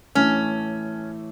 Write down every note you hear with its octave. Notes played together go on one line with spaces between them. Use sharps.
A2 E3 A3 C#4